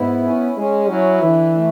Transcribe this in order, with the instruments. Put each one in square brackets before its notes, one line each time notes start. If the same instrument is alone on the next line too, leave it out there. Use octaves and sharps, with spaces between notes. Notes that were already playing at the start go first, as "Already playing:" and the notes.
Already playing: [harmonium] G#2 E4 [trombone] B3
[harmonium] C#4
[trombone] G#3 [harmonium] C#4
[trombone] F#3 [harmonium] E4
[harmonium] D3 [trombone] E3
[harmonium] A3